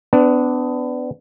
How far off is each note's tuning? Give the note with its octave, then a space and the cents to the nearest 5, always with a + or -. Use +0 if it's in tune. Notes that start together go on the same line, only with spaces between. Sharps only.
B3 +30 D4 +0